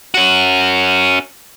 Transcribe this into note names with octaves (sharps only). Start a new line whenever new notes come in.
C#4 F#4